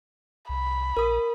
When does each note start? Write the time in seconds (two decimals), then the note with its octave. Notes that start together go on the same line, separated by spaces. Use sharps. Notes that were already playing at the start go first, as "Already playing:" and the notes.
0.49 C2 B5
0.97 A#1 A#4 D#6